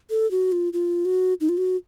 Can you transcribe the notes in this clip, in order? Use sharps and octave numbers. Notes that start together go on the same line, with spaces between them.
A4
F#4
F4
F4
F#4
D#4
F4
F#4